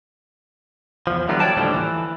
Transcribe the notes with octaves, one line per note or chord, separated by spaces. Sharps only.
E2 F3
D3 E3 F#3 G3 B3
C#5 D5 G5 A5
D#2 A2 D3 F3 G3
E3